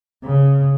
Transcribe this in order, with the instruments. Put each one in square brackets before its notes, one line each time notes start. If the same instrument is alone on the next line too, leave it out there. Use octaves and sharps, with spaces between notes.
[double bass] C#3